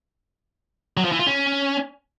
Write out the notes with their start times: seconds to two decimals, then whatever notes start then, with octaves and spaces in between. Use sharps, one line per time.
0.97 F#3
1.05 F3
1.12 E3
1.19 F4
1.27 C#4